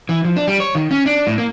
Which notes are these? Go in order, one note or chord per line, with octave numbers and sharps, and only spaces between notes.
E3
F3
D4
G3
C#5
D#3
C#4
D4
A2
A#3